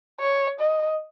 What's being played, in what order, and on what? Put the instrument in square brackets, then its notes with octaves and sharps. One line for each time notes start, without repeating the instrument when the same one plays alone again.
[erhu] C#5
D#5